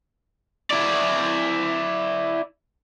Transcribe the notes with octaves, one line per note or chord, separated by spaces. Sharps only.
E4 D5